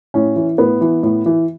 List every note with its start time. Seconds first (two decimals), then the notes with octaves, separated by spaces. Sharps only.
0.14 A2 C#4
0.36 E3
0.58 A2 B3
0.81 E3
1.03 A2
1.26 E3